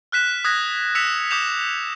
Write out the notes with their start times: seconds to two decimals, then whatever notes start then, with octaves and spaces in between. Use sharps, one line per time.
0.12 F6 F#6 B6 E7
0.45 D#6 F#6 G#6 A#6 B6
0.95 E6 B6 C#7 E7 F7
1.31 D6 D#6 G6 B6 E7 F7